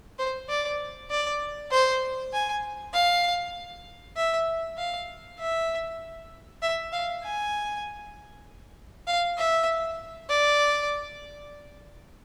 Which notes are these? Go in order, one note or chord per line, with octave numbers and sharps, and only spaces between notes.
C5
D5
D5
C5
G#5
F5
E5
F5
E5
E5
F5
G#5
F5
E5
D5